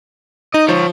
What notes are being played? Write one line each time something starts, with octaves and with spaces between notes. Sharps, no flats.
D#4 D#5
F3 F4 C#5